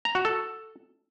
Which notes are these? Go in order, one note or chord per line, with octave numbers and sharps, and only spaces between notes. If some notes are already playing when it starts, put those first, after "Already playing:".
A#5
F#4
A4